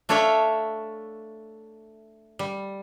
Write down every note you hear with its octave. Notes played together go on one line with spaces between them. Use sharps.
A3 D4 A4 C#5 E5 F5
G3